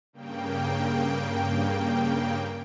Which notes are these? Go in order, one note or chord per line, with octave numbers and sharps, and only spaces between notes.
G2 C#3 A#3 G5